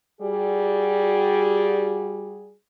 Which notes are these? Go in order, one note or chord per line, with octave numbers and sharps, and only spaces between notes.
G3 F#4 G#4